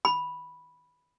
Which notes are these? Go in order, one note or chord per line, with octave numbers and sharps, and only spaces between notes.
B5